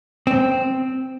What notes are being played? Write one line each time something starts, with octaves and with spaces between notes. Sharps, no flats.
C4